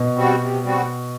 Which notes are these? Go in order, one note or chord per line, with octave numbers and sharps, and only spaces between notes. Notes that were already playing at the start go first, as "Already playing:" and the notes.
Already playing: B2
G3 C4 F#4
C3
G3 C4 F#4